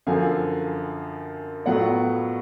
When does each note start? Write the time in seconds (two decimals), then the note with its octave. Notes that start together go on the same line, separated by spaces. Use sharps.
0.07 F#2 D3 F3 F5 G#5
1.66 A2 F#3 B3 F4 D5 F#5